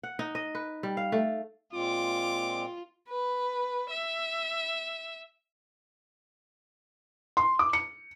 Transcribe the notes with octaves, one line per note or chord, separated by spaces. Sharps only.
F#5
D#4
D#5
B4
G3
F5
A3
A#2 G#3 C4 F4 D6
B4
E5
C6
D6
C#7